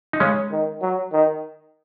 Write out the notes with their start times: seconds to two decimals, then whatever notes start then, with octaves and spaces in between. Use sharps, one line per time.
0.13 D#4
0.20 C#3 G#3 C#4
0.51 D#3
0.81 F#3
1.12 D#3